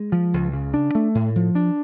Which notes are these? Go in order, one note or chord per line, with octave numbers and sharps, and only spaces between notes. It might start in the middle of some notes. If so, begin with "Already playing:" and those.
Already playing: G#3
F3
C#2
C#3
D4
A3
A2
F3
D4